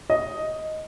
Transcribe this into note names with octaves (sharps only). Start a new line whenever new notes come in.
D#5